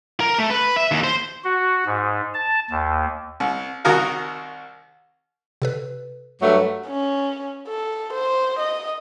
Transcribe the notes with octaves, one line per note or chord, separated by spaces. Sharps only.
A#4
A3
B4
E5
D#2
C5
F#4
G#2
A5
D#2
C2
C2 D#3 F#4 A#4 F5
C3 A4 B4
G2 F#3 A3
C#4
A4
C5
D#5